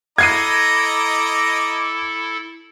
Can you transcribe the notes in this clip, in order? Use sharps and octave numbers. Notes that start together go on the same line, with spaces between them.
E4 A4 D#5 A#5 D6 G#6 C7 D#7